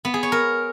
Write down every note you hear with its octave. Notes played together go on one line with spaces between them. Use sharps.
B3
G#4
C#5
A#4